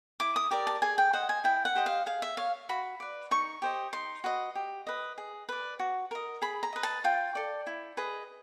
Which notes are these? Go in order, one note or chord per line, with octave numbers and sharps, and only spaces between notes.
E4 D6
D#6
G4 A#4 D5 D6
A5
G#4 G#5
G5
C5 D#5 F#5
G#5
E4 G5
F#5
G4 C5 D#5
F5
G#4 F5
E5
C#5 F5
F#4 B5
B4 D5
D#4 C#6
G4 C5 D#5
D#4 C6
F#4 B4 D#5
G4
B4 D#5
G#4
B4 D5
F#4
A#4 D#5
G#4 B5
A#5
B4 D#5
A5
F4 G5
A4 D5
E4
G#4 B4 D#5